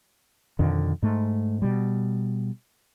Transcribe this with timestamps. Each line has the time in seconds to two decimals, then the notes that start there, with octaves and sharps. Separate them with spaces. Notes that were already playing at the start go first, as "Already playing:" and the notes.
0.59 F2 B2 D3 D#3
1.02 G#2 A3
1.62 B2 G3